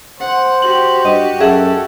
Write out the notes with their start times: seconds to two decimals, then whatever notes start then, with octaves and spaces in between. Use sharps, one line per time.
0.20 C5 F#5
0.62 F#4 G4 F#7
1.05 G2 D#5
1.40 F#2 G#4 A4 E5 F#5